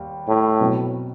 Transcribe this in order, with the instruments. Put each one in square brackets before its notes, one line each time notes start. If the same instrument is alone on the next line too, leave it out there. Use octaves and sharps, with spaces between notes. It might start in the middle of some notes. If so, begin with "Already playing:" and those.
Already playing: [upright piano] D#2 G3
[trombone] A2
[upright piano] B2 F#3 C4